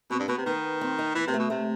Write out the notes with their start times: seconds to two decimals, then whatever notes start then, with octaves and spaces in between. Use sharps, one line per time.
0.10 B2 C4
0.20 G2
0.28 B2 B3
0.37 C3
0.46 D#3 B3
0.81 C4
0.99 D#4
1.15 E3 B3
1.27 C3 B3
1.34 A3
1.39 B2
1.50 C3 A3